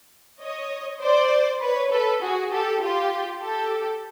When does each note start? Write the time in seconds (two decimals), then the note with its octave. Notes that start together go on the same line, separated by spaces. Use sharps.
0.41 C#5 D#5
1.01 C5 D5
1.61 B4 C#5
1.91 A4 B4
2.22 F#4 G#4
2.51 G4 A4
2.82 F4 G4
3.42 G4 A4